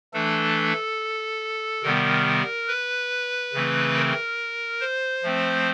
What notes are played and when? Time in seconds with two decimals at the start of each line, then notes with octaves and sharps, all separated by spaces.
0.13 E3 A3 D4 A4
1.83 C3 D#3 G3 B3 A#4
2.68 B4
3.53 C#3 E3 A3 C4
3.96 A#4
4.81 C5
5.23 F3 A3 C4